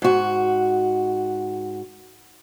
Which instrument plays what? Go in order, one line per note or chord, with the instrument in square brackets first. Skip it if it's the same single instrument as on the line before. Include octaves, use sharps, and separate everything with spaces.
[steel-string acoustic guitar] G#2 F#4